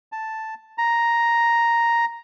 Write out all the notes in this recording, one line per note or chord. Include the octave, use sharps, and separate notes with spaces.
A5
A#5